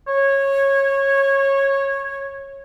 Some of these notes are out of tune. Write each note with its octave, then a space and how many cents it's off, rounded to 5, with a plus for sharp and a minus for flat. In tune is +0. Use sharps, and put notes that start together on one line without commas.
C#5 -15